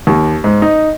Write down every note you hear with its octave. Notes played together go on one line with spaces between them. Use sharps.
D#2
G#2
D#4